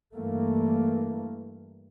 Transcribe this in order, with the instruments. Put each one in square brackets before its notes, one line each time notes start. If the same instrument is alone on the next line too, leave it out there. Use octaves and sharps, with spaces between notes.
[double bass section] G2 E3 A3 A#3